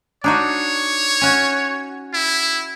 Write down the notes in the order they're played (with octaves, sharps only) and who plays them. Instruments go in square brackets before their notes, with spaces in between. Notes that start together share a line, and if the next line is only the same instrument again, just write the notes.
[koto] D4 D#4 F#4 [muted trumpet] C#5
[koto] C#4 F#4
[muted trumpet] E4